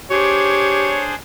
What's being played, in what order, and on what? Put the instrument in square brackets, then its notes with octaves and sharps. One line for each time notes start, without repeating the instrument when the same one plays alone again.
[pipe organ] D4 G#4 C5 [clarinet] G4 [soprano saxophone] C#5